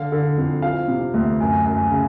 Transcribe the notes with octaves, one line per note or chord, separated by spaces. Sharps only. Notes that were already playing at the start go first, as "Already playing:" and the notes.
Already playing: D3 F5
D3
F2
F3 F5
C3
D2
F#2
F#2
C#3